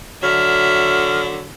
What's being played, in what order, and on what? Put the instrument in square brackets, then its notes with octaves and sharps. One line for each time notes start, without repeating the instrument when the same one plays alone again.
[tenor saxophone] D3 [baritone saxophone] F#3 [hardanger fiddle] E5 [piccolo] F6